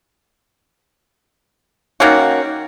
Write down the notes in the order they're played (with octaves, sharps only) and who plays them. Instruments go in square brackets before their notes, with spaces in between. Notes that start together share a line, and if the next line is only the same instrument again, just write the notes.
[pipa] D#3 A#3 C#4 F#4